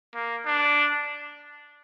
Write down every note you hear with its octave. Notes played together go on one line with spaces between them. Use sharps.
A#3
D4